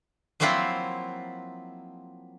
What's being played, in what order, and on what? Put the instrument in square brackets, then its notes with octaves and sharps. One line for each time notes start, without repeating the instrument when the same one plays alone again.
[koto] F3 F#3 A#3 C4 E4 F4